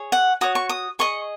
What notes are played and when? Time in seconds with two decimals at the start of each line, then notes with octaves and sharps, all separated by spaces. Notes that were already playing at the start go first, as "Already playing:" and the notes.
Already playing: G#4 C#5
0.12 F#5
0.41 F#4 C#5 D#6
0.55 C#6
0.69 D#6
0.99 G#4 D#5 C#6